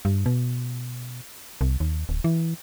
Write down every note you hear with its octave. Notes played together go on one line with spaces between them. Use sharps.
G2
B2
C2
D#2
D1
E3